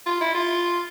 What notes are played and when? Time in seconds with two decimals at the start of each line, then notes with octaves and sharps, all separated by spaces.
0.06 F4
0.21 E4
0.34 F4